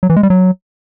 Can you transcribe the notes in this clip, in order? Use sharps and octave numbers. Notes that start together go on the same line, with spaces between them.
F#3
E3
G#3
G3
F#3